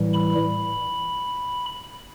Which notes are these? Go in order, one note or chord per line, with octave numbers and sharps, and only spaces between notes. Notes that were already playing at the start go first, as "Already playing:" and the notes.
Already playing: A2 E3 G3
B5